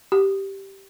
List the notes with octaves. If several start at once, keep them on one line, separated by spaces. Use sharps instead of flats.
G4